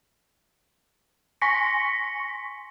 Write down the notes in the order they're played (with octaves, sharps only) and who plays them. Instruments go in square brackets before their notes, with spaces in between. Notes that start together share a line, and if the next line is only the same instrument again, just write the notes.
[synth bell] G#5 C6 C#6 A#6 B6 C#7